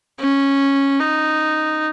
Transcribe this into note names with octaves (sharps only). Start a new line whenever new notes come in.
C#4
D#4